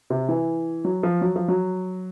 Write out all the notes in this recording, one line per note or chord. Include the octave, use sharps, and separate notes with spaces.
C3
E3
F#3
F3
F#3
F3
F#3